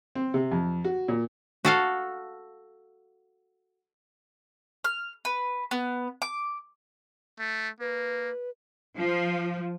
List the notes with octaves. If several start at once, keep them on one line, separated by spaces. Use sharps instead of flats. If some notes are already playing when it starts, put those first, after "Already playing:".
C4
C3
F2
F#4
A#2
F#4 A4 F5
F6
B4
B3
D6
A3
A#3 B4
F3